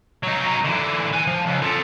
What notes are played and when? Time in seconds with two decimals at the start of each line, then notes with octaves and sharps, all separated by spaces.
0.23 F#3 D#4
0.64 D3 E3
1.13 B4 G#5
1.27 F3
1.47 C#2
1.62 F4 A4